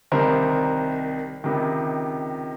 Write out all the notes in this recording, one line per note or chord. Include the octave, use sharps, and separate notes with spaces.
C2 C3 D#3 A#4 C5
C#2 C3 D#3